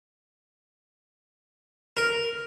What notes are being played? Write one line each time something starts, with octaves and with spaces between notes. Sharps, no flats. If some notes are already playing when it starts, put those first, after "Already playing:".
A#4